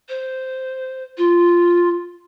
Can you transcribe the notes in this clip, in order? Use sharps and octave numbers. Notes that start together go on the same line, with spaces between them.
C5
F4